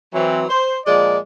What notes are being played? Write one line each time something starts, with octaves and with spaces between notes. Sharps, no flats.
E3 F#3 C4
C5
A#2 F3 G#3 D5